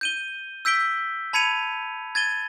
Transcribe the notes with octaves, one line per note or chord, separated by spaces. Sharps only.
G6 D#7 G7
E6 G6 B6 D7 G7
A5 B5 G#6 C#7 D#7 F7
G#6 A6 D#7 G7